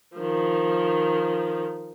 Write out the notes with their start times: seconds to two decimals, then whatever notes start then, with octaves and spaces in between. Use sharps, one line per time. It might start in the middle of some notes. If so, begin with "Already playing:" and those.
0.17 D#3 F3